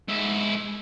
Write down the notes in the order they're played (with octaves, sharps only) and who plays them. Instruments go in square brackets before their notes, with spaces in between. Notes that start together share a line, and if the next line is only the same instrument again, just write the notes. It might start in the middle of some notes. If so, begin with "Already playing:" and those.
[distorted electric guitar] G#2 E4